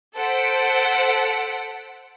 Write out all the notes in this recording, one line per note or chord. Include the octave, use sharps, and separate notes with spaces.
A4 C5 F#5 B6 D7